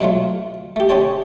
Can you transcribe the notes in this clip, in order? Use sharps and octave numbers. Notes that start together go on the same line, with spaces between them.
B2 F#3 A3 F4
A3 G4
C#4 G4 C5 C#5 A5